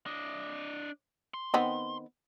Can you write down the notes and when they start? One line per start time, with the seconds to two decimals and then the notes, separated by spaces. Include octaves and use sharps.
0.06 D4 D#5
1.34 C6
1.54 D#3 B3 C4